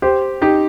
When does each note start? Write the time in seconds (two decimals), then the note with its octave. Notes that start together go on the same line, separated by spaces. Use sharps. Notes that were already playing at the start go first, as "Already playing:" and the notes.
0.02 G4 C5
0.42 D#4 G4